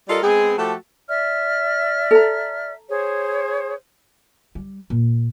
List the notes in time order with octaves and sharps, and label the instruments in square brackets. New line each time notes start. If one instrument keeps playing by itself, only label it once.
[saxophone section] G3 F4 A4 A#4 D5 D#5
G#3 B3 C4 G#4
F3 A3 F#4 G4 A4
[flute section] D5 E5 F6
[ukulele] A4 A#5
[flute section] G#4 C5 C#5
[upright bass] G3
A#2